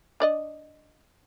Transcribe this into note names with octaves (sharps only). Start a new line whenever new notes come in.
D4 D5 D#5